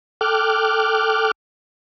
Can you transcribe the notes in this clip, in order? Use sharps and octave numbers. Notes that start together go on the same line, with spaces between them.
A4 G5 D6 F6 F#6